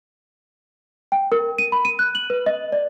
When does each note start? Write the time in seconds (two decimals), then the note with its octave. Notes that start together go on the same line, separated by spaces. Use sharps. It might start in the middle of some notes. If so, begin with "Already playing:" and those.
1.12 G5
1.32 A#4
1.58 D#7
1.72 B5
1.85 D#7
1.99 F#6
2.15 F#7
2.30 B4
2.46 D#5
2.72 D5